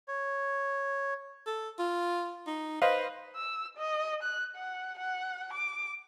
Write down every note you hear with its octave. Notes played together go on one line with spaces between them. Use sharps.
C#5
A4
F4
D#4
B4 C5 D#5 F5
E6
D#5
F#6
F#5
F#5
D6